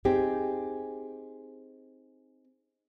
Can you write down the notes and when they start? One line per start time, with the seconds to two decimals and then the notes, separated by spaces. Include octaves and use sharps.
0.05 C4 D#4 G4 G#4